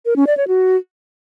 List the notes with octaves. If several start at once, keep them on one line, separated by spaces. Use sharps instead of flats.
A#4
C#4
D5
C#5
F#4